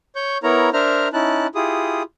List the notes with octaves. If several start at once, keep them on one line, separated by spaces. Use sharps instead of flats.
C#5 C#6 G6
B3 E4 A#4 C#5 A#5
D4 A#4 C5 E5 A#5 F6
C#4 D#4 E4 A5 F#6
E4 F4 G4 G#4 D#6